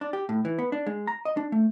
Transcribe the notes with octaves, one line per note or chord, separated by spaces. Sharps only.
D4
G4
A2
E3
B3
D4
G#3
A#5
D#5
D4
A3